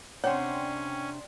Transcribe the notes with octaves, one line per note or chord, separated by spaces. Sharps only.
C3 C#4 D4 C#5 D5 F#5 G5 C6